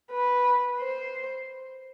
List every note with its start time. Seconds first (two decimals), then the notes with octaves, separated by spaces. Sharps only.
0.11 B4
0.80 C5